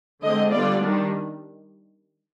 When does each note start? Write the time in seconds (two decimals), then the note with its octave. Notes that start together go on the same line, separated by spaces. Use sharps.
0.22 D3 G#3 C4 D#5
0.51 D3 G3 B3 F4 D5
0.81 D#3 G3 D4